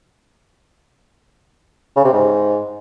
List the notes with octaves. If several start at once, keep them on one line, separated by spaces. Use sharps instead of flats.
C#3
C3
G#2